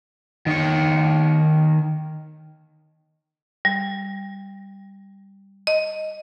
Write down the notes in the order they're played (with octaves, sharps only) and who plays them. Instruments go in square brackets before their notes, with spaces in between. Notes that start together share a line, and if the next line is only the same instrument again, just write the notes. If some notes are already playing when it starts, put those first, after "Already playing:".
[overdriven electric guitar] D#3 C#5
[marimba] G3
D#5